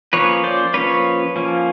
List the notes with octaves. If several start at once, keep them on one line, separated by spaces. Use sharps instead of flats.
F3 A#3 C#4 B4 C#5
C5 D5
F3 A#3 C#4 B4 C#5
F3 A#3 C#4